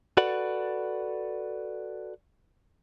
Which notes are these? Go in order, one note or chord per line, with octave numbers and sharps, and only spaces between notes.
F#4 A4 B4 D5 F#5